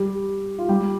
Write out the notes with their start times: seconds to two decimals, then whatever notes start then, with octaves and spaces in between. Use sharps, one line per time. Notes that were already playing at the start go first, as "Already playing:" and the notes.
Already playing: G3 G4
0.59 F4
0.69 G3 G4